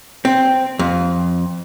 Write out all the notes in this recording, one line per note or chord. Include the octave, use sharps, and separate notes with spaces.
C4
F2